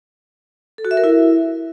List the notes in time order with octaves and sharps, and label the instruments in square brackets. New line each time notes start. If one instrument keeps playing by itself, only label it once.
[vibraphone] A4
F#4
E5
A#4
E4